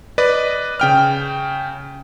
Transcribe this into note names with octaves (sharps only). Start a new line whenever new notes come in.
B4 D5 D#5
C#3 G5 F6